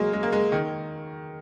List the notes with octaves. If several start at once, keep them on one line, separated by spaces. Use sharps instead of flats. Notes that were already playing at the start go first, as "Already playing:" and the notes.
Already playing: F#3 G#3 A#3
G#3
A#3
G#3
D#3